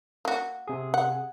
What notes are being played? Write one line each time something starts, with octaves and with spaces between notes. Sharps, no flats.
A#3 F#4
C3 G#4
F#5